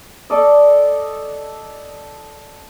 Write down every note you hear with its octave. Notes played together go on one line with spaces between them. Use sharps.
A4 D5 D#5